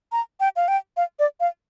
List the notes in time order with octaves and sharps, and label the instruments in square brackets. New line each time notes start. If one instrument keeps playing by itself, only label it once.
[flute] A#5
G5
F5
G5
F5
D5
F5